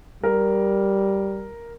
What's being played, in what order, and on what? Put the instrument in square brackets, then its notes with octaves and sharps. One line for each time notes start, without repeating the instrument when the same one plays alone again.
[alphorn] G3 [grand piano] A#4